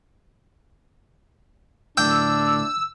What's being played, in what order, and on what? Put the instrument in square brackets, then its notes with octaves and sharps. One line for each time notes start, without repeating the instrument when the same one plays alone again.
[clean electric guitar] D2 A2 [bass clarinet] D4 [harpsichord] G5 [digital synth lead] E6